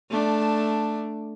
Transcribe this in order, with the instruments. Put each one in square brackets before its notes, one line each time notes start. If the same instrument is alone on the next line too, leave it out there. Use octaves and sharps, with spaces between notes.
[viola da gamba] A3 D4